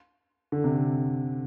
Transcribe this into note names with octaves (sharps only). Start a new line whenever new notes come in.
D3
C3